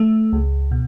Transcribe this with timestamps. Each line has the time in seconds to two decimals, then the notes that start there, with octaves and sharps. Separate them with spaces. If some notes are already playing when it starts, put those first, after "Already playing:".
Already playing: A3
0.33 C#2
0.71 B2